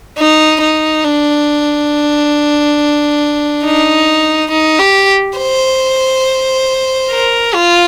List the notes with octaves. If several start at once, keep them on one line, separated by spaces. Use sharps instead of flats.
D#4
D#4
D4
D#4
D#4
G4
C5
A#4
F4